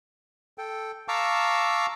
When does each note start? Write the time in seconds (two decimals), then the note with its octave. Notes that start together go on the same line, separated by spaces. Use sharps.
0.58 A4 G5
1.08 F5 A5 A#5 C#6 D6 E6